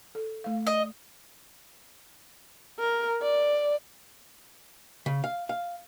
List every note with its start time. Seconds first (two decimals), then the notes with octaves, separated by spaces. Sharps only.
0.15 A4
0.44 A3 F5
0.67 D#5
2.79 A#4
3.22 D5
5.06 C#3
5.24 F5
5.49 F5